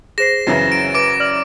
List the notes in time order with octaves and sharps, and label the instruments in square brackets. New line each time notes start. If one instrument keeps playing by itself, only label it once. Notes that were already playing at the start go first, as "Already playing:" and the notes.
[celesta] G#4 C5 C7 [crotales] A#6 E7
[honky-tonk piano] F#2 C#3 E3
[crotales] D7
[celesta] B4 [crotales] D6 D7
[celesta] D5 F6 F#7